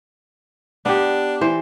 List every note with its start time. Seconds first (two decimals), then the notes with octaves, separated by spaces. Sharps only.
0.85 B3 D4 G4
1.41 E3 C5